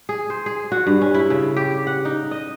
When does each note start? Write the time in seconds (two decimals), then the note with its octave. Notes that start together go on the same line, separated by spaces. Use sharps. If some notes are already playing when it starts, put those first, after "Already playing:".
0.09 G#4
0.30 C5
0.46 G#4
0.72 F#4
0.87 G2
1.01 C#4
1.14 E4
1.30 C#3
1.56 G4
1.87 F#5
2.05 D#4
2.31 D#5